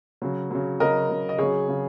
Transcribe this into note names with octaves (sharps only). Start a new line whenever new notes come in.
C#3 F#3
C#3 F#3
C#3 F#3 A#4 D#5
C#3 F#3
D#5
C#3 F#3 G#4 C#5
C#3 F#3